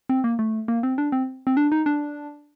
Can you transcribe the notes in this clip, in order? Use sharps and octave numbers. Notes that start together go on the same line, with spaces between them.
C4
A#3
A3
A#3
C4
D4
C4
C4
D4
D#4
D4